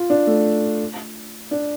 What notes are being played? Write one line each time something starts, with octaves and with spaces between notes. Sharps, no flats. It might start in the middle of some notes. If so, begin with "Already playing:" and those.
Already playing: F4
D4
A3
D4